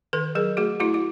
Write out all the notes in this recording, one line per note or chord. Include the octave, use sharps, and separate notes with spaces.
D#3 A4 B4
F#3 G#4 A#4
A3 F#4 G#4
A3 E4 F#4
F#4